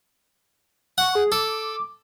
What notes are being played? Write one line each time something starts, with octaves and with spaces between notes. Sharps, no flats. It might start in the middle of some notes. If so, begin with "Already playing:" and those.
F#5 C#6
G#4
A4 D6